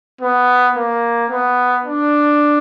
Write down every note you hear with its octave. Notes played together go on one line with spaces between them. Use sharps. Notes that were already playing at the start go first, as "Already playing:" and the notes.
B3
A#3
B3
D4